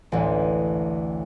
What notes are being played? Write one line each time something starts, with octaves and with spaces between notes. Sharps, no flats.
A1 D2